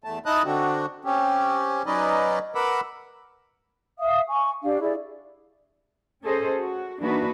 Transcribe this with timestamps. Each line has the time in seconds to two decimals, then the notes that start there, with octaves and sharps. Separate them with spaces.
0.04 E2 A3 A5
0.26 D#4 E4 D#5 A5 D#6 F#6
0.45 D3 C4 D4 F#4
1.05 C4 C#4 G4
1.86 F#3 C#4 D#4 B4 D5 D#5
2.55 A#4 B4 F#5 B5 D6 E6
3.99 E5 F5 D#6
4.28 G#5 C#6
4.62 D4 G4 F5
4.81 E4 G#4 D5
6.23 C#4 G#4 A4 C5 D#5
6.59 F#4
6.99 E3 A#3 D4 D#4 F#4 B4